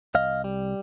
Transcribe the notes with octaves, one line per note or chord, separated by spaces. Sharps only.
C2 D#5 F5
G3